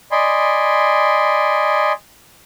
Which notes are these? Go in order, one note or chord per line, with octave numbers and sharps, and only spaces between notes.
D5 D#5 G#5 B5 C6